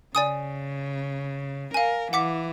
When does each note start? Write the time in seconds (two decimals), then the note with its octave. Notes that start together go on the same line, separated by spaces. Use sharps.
0.15 C#3 D5 G#5 D#6
1.74 A#4 F5 G#5
2.13 E3 F#5 D6 B6